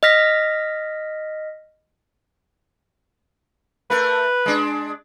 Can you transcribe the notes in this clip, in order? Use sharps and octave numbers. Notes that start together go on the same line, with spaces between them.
D#5 F6 A#6 B6
A3 A#4 B4
G#3 D4